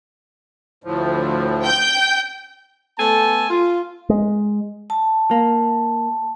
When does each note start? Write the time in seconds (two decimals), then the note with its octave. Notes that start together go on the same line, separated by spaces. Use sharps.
0.84 D2 A2 F3
1.63 G5 G6
2.98 A3 B3 A4 G#5 A5
3.50 F4
4.09 G#3
4.90 A5
5.31 A#3